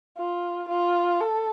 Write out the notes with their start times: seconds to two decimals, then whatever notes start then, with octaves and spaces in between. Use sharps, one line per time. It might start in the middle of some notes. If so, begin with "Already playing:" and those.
0.17 F4
0.69 F4
1.21 A4